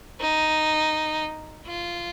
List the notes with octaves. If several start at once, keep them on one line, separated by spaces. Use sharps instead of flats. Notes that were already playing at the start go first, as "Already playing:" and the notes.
D#4
F4